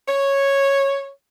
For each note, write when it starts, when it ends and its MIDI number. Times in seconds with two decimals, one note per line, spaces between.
0.08 1.08 73